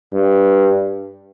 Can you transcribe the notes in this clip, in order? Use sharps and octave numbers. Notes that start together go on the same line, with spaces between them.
G2